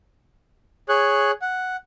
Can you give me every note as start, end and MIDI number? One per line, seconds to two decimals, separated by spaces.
0.89 1.31 68
0.89 1.31 73
0.89 1.31 90
1.42 1.76 78